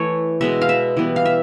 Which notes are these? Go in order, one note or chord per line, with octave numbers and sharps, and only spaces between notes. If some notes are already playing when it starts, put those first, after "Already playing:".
Already playing: E3 A3 C#5
B2 G#3 B3 E5
F5
E5
E3 G3 B3
F5
E5